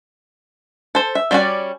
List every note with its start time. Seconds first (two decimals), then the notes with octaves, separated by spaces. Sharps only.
0.95 A4 C5
1.15 E5
1.31 G3 C4 C#4 F#4 D5